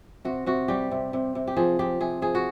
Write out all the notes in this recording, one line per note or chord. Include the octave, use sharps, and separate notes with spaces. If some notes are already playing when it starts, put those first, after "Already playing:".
C3 F#4
C3 F#4
G3 G4
C3
C3
C3
G4
F3 G#4
F3 G4
C3 G#4
F3 G#4
F#4